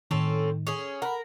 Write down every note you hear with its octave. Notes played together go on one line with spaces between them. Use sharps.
A2 D#3 C4 C#4 A4
C#4 G#4
A#4 F#5 B5